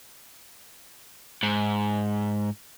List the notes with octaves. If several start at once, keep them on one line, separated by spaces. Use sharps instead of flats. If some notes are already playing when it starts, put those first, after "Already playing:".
G#2